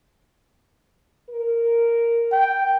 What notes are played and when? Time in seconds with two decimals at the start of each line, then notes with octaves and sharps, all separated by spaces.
1.30 A#4
2.32 G5